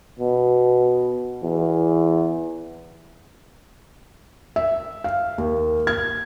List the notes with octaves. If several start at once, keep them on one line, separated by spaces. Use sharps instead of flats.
B2
E2
E5
F5
D#2
G#6